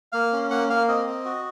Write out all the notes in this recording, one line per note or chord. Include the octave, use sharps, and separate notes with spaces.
A#3 F5
C#4
A#3 F#5
A#3 F5
C4 D#5
C4
F#4